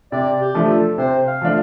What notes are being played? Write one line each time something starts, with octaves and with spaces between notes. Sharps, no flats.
C3 D5
G4
F3 A3 D4
A4
C3 C5
F5
F3 A3 D4 F5